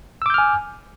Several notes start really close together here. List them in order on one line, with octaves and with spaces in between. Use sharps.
E6 D6 G6 F6 G#5